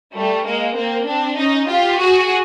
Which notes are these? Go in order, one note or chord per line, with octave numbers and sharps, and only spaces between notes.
G3 A3
G#3 A#3
A#3 C4
C4 D4
C#4 D#4
F4 G4
F#4 G#4